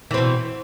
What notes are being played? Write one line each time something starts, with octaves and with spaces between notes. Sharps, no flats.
B2 E3 C4